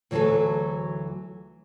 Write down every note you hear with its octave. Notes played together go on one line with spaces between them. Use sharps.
D2 E3 F#3 F#4 G#4 A4